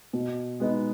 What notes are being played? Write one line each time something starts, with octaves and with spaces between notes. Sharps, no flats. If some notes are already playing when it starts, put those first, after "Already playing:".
B2
G#3 B3 D#4